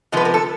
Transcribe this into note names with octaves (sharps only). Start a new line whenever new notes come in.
C3 F3 G#3 B3 B4
A#4
A4